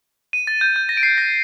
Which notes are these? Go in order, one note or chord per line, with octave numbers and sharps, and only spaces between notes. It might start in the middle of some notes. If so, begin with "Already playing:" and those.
D#7
A6
G6
G6
A#6
D7
C7
A#6